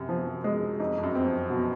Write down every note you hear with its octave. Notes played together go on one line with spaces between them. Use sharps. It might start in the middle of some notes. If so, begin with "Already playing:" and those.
Already playing: F#2 C3
F3
G#3
F2 D#4
F2
F#2
C4
F2
B2